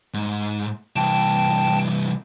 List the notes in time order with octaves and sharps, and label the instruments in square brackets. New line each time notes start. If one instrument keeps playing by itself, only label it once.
[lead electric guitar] G#2
[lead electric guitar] C2 E3 [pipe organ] G5 A5